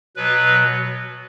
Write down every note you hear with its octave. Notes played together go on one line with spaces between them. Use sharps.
B2 F#3 B4